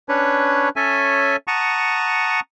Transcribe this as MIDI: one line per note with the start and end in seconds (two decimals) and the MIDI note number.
0.09 0.69 61
0.09 0.69 62
0.09 0.69 71
0.09 0.69 73
0.76 1.36 61
0.76 1.36 69
0.76 1.36 73
0.76 1.36 76
0.76 1.36 80
1.47 2.40 78
1.47 2.40 81
1.47 2.40 82
1.47 2.40 85
1.47 2.40 87